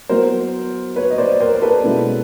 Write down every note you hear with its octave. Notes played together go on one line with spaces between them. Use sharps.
F#3 B3 E4 A#4 C5
B4 C#5
D#5
C5 D5
A#4 C5
A#4
A4 B4
B2 G#3 C#4 E4